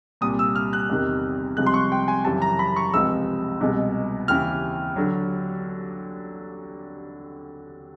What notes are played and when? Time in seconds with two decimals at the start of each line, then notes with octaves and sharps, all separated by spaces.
0.21 C2 A#2 G3 D#6
0.39 E6
0.56 F6
0.73 F#6
0.89 E2 C3 D#3 G3
1.57 C2 C3 F3 G#3 F#6
1.66 C6
1.74 C#6
1.92 G5
2.08 G#5
2.25 F#2 C#3 E3 G3 A5
2.42 A#5
2.59 B5
2.76 C#6
2.93 C#2 C3 F3 G#3 E6
3.60 C2 B2 G#3
4.28 D#2 C#3 E3 F6
4.96 D3 F#3